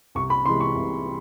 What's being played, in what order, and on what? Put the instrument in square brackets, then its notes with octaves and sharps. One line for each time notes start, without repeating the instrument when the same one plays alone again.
[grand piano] C2 [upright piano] C#6
[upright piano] B5
[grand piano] C3 E3 G#3 [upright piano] C6
[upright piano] C#6
[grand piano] C2